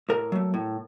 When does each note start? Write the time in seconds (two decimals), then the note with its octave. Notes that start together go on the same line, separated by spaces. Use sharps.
0.09 A2 A#4
0.32 F#3 A3
0.54 A2